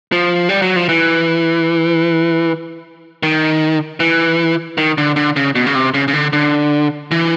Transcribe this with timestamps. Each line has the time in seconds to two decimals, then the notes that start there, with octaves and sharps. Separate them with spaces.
0.12 F3
0.49 G3
0.62 F#3
0.76 F3
0.89 E3
3.23 D#3
4.00 E3
4.78 D#3
4.98 D3
5.16 D3
5.36 C#3
5.55 B2
5.66 C#3
5.75 C3
5.94 C#3
6.08 C#3
6.13 D3
6.33 D3
7.11 E3